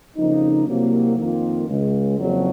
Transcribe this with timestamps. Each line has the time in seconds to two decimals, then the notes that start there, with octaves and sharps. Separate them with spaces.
0.17 F2 C#3 F3 A#3 D#4
0.67 C2 C3 F#3 A#3
1.18 F2 D#3 A#3 F4
1.67 C#2 C#3 G#3
2.18 F#1 F2 C#3 F#3